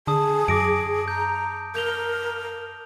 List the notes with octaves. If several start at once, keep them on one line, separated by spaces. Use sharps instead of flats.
D3 G#4 A5 D#6
F#2 D6 A#6 D7
A#5 G6
A#4 G6 F7 G7